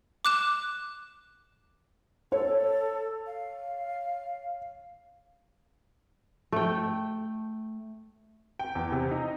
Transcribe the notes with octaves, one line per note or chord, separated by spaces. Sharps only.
D6 F#6 E7
A4 C#5
F5
A3 G5
G5
E2
C3
D#4